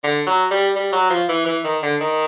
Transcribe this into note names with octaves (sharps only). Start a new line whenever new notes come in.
D3
F#3
G3
G3
F#3
F3
E3
E3
D#3
D3
D#3